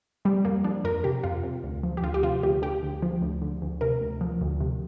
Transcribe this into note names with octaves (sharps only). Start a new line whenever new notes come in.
C3 G3
F2 A#3
F3 D4
F2 A#4
C3 G4
F2 F4
C3
D2
F3
G4
D2 F4
G4
C3 F4
D2 G4
D3 G4
D2
F3
D2
D3
D2
C3 A#4
D2
F3
D2
C3